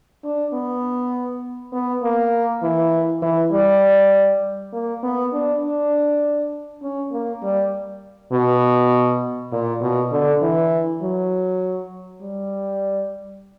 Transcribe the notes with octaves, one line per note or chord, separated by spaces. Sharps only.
D4
B3
B3
A#3
E3
E3
G3
A#3
B3
D4
D4
C#4
A#3
G3
B2
A#2
B2
D3
E3
F#3
G3